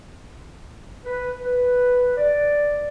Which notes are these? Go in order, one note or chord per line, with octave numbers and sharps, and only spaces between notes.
B4
B4
D5